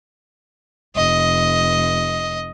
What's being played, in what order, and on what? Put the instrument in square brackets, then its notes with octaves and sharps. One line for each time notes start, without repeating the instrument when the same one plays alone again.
[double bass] F1 [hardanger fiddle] D#5